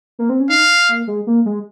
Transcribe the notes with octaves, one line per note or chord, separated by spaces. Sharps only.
A#3
C4
C#4
D#4 F5
A#3
G#3
A#3
G#3